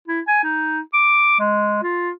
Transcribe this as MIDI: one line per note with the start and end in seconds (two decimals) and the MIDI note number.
0.08 0.20 64
0.27 0.43 80
0.44 0.80 63
0.93 1.36 86
1.39 1.79 56
1.83 2.11 65